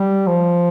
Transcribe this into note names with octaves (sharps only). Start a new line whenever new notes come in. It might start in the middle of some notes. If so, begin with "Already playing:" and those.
Already playing: G3
F3